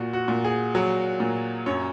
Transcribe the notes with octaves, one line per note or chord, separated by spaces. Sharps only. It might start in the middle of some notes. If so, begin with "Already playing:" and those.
Already playing: A#2 F#4
F#4
A#2
G#4
F#3
A#2
F#2 C#5